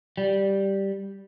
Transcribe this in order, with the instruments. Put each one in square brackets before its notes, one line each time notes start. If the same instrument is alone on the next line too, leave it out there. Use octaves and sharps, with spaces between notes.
[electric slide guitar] G3